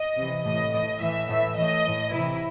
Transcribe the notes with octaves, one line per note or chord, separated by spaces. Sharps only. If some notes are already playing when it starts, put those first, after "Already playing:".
Already playing: D#5
C3 E3
A2 E3 D#5
A2 E3 D#5
A2 E3 E5
A2 E3 E5
A2 E3 D#5
A2 E3
C3 E3 E4